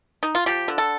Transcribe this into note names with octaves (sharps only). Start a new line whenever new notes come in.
D#4
F4
F3 G4
D3
A4